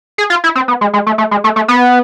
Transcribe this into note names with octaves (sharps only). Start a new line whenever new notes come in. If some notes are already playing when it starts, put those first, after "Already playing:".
G#4
F4
E4
C4
B3
G#3
G#3
A3
A3
G#3
A3
A3
B3